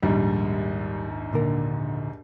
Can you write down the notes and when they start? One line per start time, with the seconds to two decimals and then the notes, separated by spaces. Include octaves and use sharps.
0.03 A#1 D#2 G#2 G3
1.33 A#2 D3 A#4